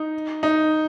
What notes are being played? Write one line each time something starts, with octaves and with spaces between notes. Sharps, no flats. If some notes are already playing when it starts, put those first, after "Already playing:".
Already playing: D#4
D#4